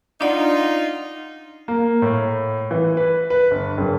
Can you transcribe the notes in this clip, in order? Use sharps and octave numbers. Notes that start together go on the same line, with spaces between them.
D4 D#4 F4 D5 F#5
A#3
A2
E3
B4
B4
G1
F#1